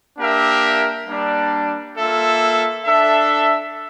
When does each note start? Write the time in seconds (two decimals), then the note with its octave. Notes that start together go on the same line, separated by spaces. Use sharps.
0.17 A#3 D4 G4 A#4 E5
1.06 G3 A#3 D4
1.96 A#3 F4 A4 E5
2.85 D4 A4 E5